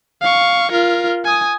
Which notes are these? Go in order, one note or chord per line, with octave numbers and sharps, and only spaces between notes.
F5 C#6
F4 A#4
G#5 D#6